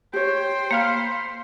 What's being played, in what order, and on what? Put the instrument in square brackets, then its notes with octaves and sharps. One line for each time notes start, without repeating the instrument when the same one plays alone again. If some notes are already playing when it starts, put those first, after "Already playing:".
[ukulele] G4 C#5 [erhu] C5 [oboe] G5
[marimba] A#3 F5 F6 [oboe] B5